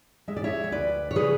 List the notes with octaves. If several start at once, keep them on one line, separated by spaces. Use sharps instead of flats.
G#3 E5
D5
C#5 E5
E5
D2 B4 D5
C#5
C#3 G#4 B4